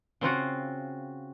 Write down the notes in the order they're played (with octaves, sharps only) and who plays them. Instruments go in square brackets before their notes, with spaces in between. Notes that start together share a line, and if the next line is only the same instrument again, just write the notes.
[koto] C#3 C4 F4 F#4